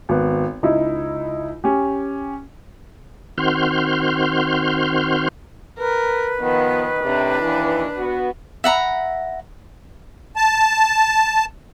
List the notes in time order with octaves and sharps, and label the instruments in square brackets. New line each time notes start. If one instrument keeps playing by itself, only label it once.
[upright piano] G#1 B3
C#2 D#4 E4
C#4 G4
[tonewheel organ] D#3 C4 F#4 C6 F6 G6
[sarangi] A#4 [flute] B4
[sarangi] D#3 [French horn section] F3 B3
[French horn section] A2 C3 [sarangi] D4
[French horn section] D#2 E3
B3 F#4
[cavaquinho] E5 F#5 A#5 B5
[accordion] A5